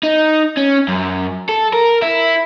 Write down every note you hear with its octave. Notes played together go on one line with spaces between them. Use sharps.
D#4
C#4
F#2
A4
A#4
E4